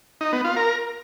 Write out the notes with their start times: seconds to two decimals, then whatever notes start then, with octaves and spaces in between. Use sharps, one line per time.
0.21 D#4
0.33 B3
0.44 F4
0.56 A#4